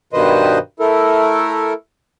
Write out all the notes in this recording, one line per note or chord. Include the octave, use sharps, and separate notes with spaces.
G2 B2 D#3 B4 C5 D#5
A3 E4 A4 A#4